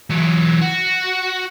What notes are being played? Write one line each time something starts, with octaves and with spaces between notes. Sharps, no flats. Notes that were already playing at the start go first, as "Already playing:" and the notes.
E3 F#3
F#4